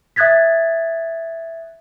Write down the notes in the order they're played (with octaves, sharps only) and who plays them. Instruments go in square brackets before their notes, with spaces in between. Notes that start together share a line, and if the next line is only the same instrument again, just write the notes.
[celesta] E5 D#6 F#6 G#6 A6 B6